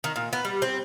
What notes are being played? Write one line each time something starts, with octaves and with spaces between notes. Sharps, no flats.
D#3
A#2
B3
G3
C4